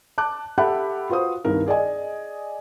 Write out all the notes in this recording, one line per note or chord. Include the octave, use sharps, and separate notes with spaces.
A5 D6 F#6
G4 A4 E5 F#5 B5 F#6
F4 F#4 B4 C5 D#6
C2 G2 D#3 A#4
G#4 D5 D#5 G#5